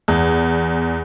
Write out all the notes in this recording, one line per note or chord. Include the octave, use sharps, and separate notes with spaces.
E2